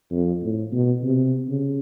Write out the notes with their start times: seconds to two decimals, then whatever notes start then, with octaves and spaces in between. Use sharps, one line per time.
0.11 F2
0.43 A2
0.72 B2
1.03 C3
1.49 C#3